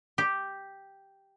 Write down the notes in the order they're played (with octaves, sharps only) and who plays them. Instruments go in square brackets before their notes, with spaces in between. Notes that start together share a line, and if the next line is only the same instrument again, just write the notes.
[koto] G4